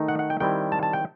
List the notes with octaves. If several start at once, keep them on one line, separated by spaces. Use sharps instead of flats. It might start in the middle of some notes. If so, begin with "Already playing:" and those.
Already playing: D#3 A3 D#4
F#5
F#5
G5
D#3 G3 C4 E4 G5
A5
A5
G5